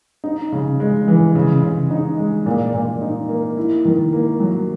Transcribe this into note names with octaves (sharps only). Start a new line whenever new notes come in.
D#4
C#3
G#3
E3
C#3
C#3
D#4
G#3
A#2
A#2
D#4
A#3
E4
D#3
A#3
F#3